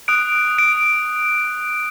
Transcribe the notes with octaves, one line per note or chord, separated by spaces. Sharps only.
D#6 F#6 D7
D7